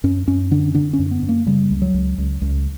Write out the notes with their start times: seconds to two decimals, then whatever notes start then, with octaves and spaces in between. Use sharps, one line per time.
0.04 F#2 C#4
0.28 F#2 C#4
0.51 D3 D4
0.75 D3 D4
0.93 C#4
0.99 F#2
1.11 B3
1.23 F#2
1.29 A#3
1.46 C#3 G3
1.71 C#2
1.82 F#3
1.94 C#2
2.18 C#2
2.42 C#2